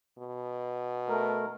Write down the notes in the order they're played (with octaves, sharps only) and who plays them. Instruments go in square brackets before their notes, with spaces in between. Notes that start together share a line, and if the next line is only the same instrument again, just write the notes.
[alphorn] B2
[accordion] A3 A#4